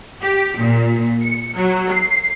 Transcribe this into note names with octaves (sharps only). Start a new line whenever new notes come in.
G4
A#2
C#7
F#3
C7